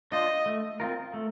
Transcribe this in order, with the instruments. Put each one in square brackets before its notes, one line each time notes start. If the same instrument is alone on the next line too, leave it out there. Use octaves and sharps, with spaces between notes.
[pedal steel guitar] D4 F4 C5 [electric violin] D#5
[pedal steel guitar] A3
C4 F4 A#4
A3